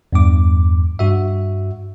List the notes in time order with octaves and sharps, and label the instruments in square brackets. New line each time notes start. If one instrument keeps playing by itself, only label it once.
[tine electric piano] E2 G2 D6
G2 F#4 E5